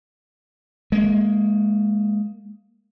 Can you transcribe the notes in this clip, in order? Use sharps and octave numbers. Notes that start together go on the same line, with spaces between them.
G#3 A#3